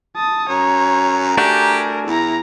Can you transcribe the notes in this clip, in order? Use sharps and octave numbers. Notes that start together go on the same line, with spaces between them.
A5 D#6
F#2 C#5 A#5
A3 D4 F#4 G4 A#4 G#5
E2 E4 A#5